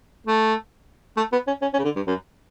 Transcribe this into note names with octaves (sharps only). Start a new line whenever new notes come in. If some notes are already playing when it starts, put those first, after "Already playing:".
A3
A3
B3
C#4
C#4
C#4
C#3
D3
G2
F#2